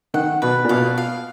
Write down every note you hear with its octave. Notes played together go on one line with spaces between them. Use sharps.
D#3 F#5
B2 B4
A#2
B2 F5
F5